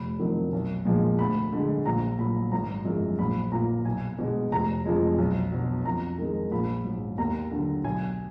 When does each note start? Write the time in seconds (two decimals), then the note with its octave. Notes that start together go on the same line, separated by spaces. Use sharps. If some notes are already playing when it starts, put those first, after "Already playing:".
Already playing: F1 B5
0.19 F2 D#3 F#3
0.53 B1
0.85 A#2 F3 G#3
1.19 D2 B5
1.52 D3 G#3
1.86 A#1 A#5
2.19 A#2 F#3 B5
2.52 G#1 A#5
2.85 F#2 F3 G#3
3.19 A#1 B5
3.52 A#2 F#3 A#5
3.85 B1 G#5
4.19 B2 G#3
4.52 F1 A#5
4.85 F2 F3 G#3
5.18 B1
5.52 B2 F#3
5.85 F2 A#5
6.18 D#3 G#3
6.51 A#1 B5
6.85 G#2 F#3
7.18 D#2 A#5
7.51 D3 F#3
7.84 B1 G#5